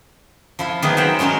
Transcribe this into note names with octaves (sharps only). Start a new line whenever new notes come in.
F3 E4 F4
D#3 F#3 A#3 B3 G#4 B4
C5 E5 F#5 G5 A#5
F#3 G#3 C#4 A#4 C#5